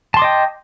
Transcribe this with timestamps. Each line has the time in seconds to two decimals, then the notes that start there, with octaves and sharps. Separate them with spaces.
0.14 A5
0.17 C6
0.19 D6
0.22 D#5
0.24 G5